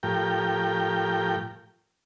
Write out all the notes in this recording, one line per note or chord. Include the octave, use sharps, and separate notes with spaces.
A2 F3 G4 A#4 G5